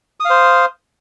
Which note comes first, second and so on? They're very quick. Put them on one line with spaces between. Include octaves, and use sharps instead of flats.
D#6 F5 C5